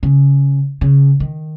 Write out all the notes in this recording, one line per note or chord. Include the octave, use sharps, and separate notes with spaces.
C#3
C#3
D#3